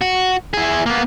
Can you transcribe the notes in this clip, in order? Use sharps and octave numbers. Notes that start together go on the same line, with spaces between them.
F#4
E4 G#4
A#3 B3